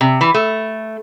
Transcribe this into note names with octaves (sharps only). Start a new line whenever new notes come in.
C3
E3
A3